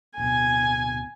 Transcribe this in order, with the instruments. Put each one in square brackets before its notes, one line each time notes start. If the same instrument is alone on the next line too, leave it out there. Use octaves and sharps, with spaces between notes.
[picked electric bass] D1 B2 [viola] G#5